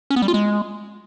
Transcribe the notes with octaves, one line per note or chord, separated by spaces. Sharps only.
C#4
B3
G3
F4
G#3